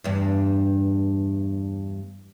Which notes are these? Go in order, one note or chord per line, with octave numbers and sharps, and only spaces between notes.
E2 G2